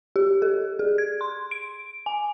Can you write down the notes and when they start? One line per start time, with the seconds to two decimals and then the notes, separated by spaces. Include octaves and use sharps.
0.16 G4
0.42 A4
0.79 G#4
0.98 G#6
1.21 C6
1.51 D7
2.06 G#5